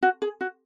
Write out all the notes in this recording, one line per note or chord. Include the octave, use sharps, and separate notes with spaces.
F#4
G#4
F#4